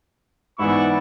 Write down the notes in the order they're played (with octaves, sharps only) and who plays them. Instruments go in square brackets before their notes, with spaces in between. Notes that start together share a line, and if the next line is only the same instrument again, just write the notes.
[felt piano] G#2 E3 B3 [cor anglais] E4 [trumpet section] D5 F#5 C#6